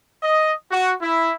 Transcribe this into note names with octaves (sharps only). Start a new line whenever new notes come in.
D#5
F#4
E4